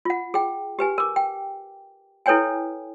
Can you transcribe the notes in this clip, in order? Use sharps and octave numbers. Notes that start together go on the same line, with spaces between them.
F4 F#5
G#4 G5
G4 B4 G#5
A#4 D6
G5
E4 A4 B4 C#5 G5 G#5